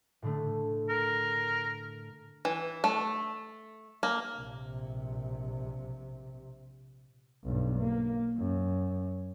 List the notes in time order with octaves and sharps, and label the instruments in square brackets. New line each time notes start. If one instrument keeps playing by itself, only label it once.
[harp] A2 D3 A3
[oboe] A#4
[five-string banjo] E3
A3
A#3
[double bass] A#1 C3
B1 G2
A#3
F#2